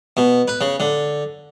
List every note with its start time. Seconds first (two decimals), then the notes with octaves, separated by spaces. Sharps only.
0.17 B2
0.48 B4
0.61 C#3
0.80 D3